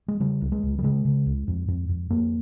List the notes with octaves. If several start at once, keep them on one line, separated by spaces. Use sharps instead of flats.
G#3
C#3 G3
C#2
G#3
C#2
G3
C#3 G#3
C#3
C#2
F2
F2
F2
F2 A#3